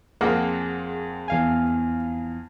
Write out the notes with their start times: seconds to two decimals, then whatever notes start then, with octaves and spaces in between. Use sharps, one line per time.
0.21 F2 A#3 C4 G#4 F#5
1.28 E2 F5 G#5